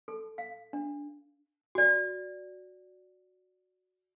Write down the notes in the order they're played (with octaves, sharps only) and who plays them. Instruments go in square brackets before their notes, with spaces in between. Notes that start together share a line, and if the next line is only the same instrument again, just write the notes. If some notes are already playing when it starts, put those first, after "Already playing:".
[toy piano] A4
F5
D4
F#4 D5